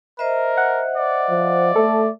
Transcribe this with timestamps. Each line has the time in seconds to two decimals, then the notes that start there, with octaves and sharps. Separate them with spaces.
0.19 A#4 C5 D#5 E5
0.57 F#5
0.97 D5
1.30 F3
1.76 A3 A4